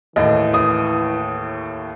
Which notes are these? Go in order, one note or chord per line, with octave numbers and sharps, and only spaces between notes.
D#2 A2 E3 D#5
D#6